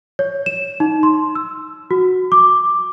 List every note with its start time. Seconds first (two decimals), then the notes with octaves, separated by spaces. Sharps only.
0.19 C#5
0.46 E7
0.80 D#4
1.03 C6
1.35 E6
1.91 F#4
2.32 D6